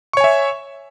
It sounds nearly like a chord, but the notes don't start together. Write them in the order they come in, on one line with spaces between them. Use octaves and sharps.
C#6 C#5 G#5 E5